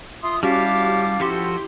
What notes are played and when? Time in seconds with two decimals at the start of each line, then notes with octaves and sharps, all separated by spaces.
0.23 F4 E5 C6 D#6
0.43 G3 C#4 E4 F#4 G4 F5 A5 D6
1.20 F3 E4 F#4 G4 A4 C6